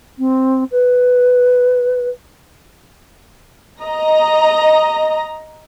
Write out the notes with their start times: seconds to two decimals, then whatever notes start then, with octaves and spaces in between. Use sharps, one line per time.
0.18 C4
0.71 B4
3.83 D#5 A#5